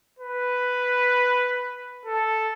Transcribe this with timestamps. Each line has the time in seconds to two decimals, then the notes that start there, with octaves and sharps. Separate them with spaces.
0.19 B4
2.05 A4